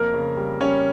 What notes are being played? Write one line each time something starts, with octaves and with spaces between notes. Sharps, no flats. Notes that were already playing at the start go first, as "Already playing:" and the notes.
Already playing: F2 A#3 A#4
C#3
G3
G3 C#4 C#5